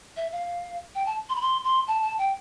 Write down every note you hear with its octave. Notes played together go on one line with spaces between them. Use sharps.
E5
F5
G5
A5
C6
B5
C6
C6
A5
A5
G5